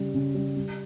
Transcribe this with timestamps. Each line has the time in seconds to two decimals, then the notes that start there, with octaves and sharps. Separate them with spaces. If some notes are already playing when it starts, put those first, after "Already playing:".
Already playing: C#3 G3
0.14 C#3
0.35 G3
0.56 G3